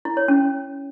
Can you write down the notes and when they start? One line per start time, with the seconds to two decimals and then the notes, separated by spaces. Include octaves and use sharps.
0.05 E4
0.17 C#5
0.28 C#4